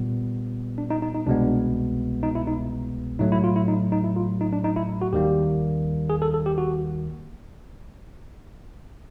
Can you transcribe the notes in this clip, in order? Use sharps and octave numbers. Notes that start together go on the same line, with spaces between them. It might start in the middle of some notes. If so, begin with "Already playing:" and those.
Already playing: A#2 G3 B3
D4
D#4
D#4
D#4
C2 B2 G#3 B3 D4
D#4
E4
D#4
A2 F#3 A3 D#4
E4
F4
E4
D#4
D#4
E4
F4
D#4
D4
D#4
E4
F#4
D#2 D#3 G3 A#3 G4
G#4
A4
A4
G4
F#4